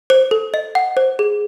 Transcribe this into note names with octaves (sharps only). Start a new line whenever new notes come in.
C5
A4
D#5
F#5
C5
G#4